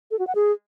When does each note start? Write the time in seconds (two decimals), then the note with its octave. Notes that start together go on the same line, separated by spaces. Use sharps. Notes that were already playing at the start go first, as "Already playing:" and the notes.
0.11 A4
0.19 F#4
0.27 F#5
0.35 G#4